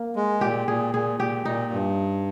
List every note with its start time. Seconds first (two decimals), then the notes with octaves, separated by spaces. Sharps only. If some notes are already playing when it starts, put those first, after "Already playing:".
Already playing: A#3
0.16 G#3
0.41 A#2 G4
0.68 A#2 G#4
0.94 A#2 G#4
1.20 A#2 G4
1.45 A#2 D#4
1.72 G2